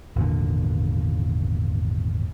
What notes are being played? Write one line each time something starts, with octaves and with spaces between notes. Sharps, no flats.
G#1 E2 A#2 D3